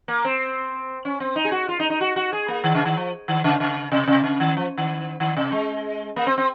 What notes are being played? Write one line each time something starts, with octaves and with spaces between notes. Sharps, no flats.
A#3
C4
C#4
C4
D#4
G#4
F#4
F4
D#4
D#4
F#4
F#4
G#4
A#3
D#3
C#3
D#3
F3
D#3
C#3
C#3
C3
C3
C#3
D#3
F3
D#3
D#3
C3
G#3
A#3
C4
C4